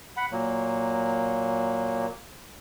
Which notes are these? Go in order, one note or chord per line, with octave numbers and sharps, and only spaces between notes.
F#5 B5
A#2 F#3 A#3